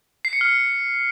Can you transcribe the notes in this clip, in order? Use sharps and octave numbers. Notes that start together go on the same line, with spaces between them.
C7
C#7
F6